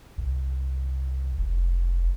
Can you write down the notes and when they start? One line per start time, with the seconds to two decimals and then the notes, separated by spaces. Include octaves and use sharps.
0.18 C2
1.38 F1